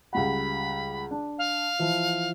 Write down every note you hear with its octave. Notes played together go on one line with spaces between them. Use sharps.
C#2 G3 F#5 B5
D4
F5
E3 F3